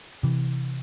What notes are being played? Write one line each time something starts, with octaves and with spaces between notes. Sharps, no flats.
C3 E3